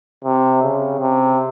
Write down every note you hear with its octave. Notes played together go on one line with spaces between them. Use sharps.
C3
C#3
C3